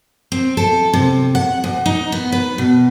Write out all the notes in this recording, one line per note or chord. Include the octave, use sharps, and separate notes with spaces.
C4
A4
C3
F#5
D2
D#4
B3
B4
B2